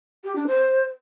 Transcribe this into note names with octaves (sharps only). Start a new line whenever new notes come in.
G4
D4
C5